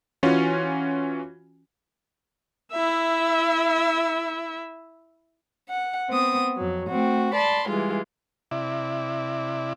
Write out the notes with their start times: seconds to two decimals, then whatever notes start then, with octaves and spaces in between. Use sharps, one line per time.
0.23 E3 C#4 F4 F#4
2.72 E4 E5
5.69 F#5
6.10 B3 C4 D#6
6.57 F2 F#3
6.88 A3 C4 F#4
7.35 D5 A5 B5 C6
7.69 E3 G3 G#3 F4
8.51 C3 E4 D5